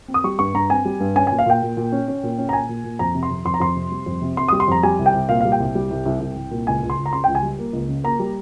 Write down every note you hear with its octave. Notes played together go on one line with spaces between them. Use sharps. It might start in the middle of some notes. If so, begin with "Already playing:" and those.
C4
D#6
G3 C#6
G2 C#6
G2 A#5
C4 G#5
G3
G2
C#4 G#5
A#2 G#5
F5
A#2 G5
A#2
A#2
C#4
C#4
A#2
C#4
A#5
A#2 G#5
A#2
A#2
F2 A#5
C3
C6
F2
F2 C6
A#5
F2 C6
C3
G3
F2
C3
C3 C6
G3 D#6
C6
F2 A#5
G3 G#5
C2
G5
C2
A#2 F5
G3 F5
G5
C2
G3
C2
C2
C2
C2
A#2
C#2 G#5
C#2
C6
C#2
A#5
C#3 C6
C#2 G5
G#5
G3
A#3
C#2
C#3
A#3 A#5
G3